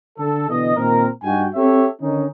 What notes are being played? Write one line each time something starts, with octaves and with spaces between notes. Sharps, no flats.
D3 A4
B2 D3 E3 D#5
A#2 D#3 C4 A#4
G2 D#4 F#4 G5 G#5
C4 G4 A4 C#5 E5
D3 D#3 C#4 D#4